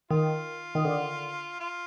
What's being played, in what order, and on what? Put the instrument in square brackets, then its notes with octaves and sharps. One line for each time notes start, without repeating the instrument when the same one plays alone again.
[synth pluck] D#3 [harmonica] F4
[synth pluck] D#3
D3
[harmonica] F4